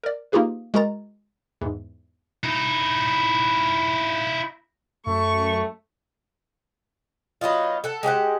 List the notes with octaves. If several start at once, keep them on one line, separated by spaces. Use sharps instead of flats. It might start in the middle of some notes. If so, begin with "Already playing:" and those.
A#4 D5
A#3 D#4 F4 G4 G#4 B4
G#3 F#4 A#4 A#5 A6
E2 G#2
D#4 E4
F#2 A3 C#6
F#3 B3 D#4 F4
A4 F#5
G#3 G4 C5 F#5